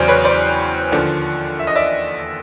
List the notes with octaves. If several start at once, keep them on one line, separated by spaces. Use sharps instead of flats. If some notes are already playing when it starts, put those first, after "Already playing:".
Already playing: E2 C#3 F#3 C5 D5 G5
B4 C#5
C5 D5
D#2 D3 F3
E5
D#5
D5 E5